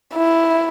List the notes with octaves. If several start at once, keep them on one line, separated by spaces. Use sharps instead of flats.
E4